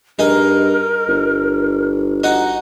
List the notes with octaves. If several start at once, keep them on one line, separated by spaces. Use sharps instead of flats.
G2 D#4 G#4 A#4 D#5
G1
D#4 F#4 D#5